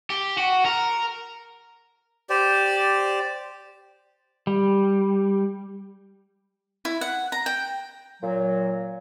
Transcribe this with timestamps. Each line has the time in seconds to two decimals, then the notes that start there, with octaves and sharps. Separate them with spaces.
0.10 G4
0.38 F#4
0.65 A#4
2.30 G4 C5 D5
4.47 G3
6.85 E4
7.01 F#5
7.32 A#5
7.46 G5
8.22 A#2 F#3